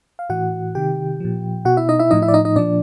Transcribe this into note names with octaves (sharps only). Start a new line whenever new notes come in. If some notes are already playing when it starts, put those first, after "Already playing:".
F5
A2 E3 F#4 F#5
C3 D#3 G4 G5
A#2 F3
B2 F#4 F#5
E4 E5
D#4 D#5
E4 E5
A2 F3 D#4 D#5
E4 E5
D5
D#4 D#5
D#4 D#5
A#2 F3 D4 D5